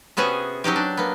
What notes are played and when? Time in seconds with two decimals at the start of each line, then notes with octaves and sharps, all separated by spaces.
0.17 C3 B3 C#4 F#4 G#4
0.64 F#3 C#4 D#4 G4
0.76 D4
0.97 A#3 B3